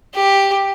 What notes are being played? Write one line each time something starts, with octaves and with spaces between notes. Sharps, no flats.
G4